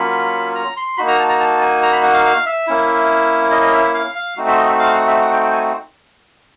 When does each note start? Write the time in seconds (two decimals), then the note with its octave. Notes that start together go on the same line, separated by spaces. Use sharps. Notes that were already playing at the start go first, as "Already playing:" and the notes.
Already playing: F#3 A#3 C#4 F4 B5
0.55 A#5
0.77 C6
0.98 A#3 D#4 F#4 B5
1.08 A#5
1.19 A5
1.29 A#5
1.40 A5
1.61 G#5
1.83 A#5
1.92 B5
2.03 F#5
2.14 F5
2.25 F5
2.46 E5
2.67 A#3 C#4 E4
3.51 D#5
3.62 D#5
3.73 E5
3.84 E5
3.94 F5
4.15 F5
4.37 A3 C4 D#4 F#4
4.47 E5
4.58 D#5
4.69 E5
4.80 F5
4.93 F#5
5.07 E5
5.22 F#5
5.33 G5
5.43 G5
5.53 G#5